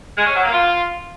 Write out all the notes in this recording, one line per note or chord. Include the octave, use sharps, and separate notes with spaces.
G#3
C#4
F#3
A#3
F4